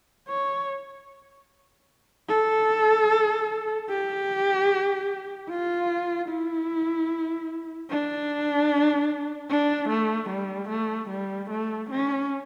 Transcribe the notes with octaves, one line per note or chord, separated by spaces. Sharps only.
C#5
A4
G4
F4
E4
D4
D4
A3
G3
A3
G3
A3
C#4